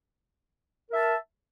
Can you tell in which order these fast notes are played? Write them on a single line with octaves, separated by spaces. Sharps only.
A#4 E5 A5